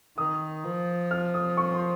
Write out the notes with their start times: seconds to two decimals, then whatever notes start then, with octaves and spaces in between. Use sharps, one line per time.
0.17 D#3 D#6
0.64 F3
1.11 F6
1.34 D#6
1.57 C#6
1.74 C6